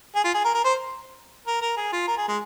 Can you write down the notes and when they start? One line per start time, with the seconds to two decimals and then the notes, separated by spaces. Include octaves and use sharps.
0.16 G#4
0.24 F4
0.34 G#4
0.44 A#4
0.54 A#4
0.64 C5
1.47 A#4
1.61 A#4
1.77 G#4
1.93 F4
2.07 A#4
2.17 G#4
2.28 G#3